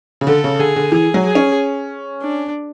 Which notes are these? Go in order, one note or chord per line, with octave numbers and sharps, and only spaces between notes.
C#3
D3 A4
C#3
D3 G#4
D3
E3 G#4
F#3
G#4
C#4
D4